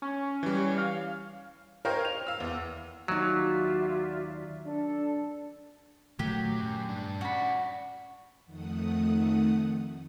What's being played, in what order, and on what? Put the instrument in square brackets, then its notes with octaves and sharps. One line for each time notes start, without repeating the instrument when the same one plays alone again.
[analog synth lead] C#4
[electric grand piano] E3 G3
[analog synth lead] F5
[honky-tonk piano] A#4 C5 C#5 D#5 F5 G5
F7
F5 E6
E2
[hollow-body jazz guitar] D#2 D#4 [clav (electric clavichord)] F#3 [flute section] F4 D5 E5 [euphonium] F#4
[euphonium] D4 [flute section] A4
[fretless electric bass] A#2 D#3 A3 [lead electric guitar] F#3 [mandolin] G4
[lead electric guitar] F#2
G2 D4
[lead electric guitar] C#4 D5 [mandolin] F#4 B5
[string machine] F2 D#3 A3 F#5 D#6